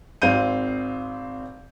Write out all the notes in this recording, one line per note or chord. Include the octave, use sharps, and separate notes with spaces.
G#1 C4 F5 G6 D#7